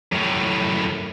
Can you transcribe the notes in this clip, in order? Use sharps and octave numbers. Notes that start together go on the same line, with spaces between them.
F#2 A2